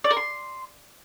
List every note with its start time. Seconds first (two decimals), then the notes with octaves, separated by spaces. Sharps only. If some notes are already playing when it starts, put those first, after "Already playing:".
0.04 D5
0.11 A#4
0.17 C6